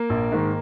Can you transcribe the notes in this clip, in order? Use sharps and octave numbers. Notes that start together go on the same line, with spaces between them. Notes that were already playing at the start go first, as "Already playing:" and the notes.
Already playing: A#3 A#4
A#1
G#2 D#3